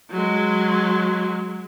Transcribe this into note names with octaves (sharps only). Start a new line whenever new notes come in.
F#3 G#3